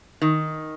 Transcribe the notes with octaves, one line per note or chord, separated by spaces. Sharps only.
D#3